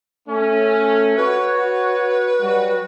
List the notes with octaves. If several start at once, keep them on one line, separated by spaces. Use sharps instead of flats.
A3 C#4
F#4 B4 C#5
F#3 G3 F#4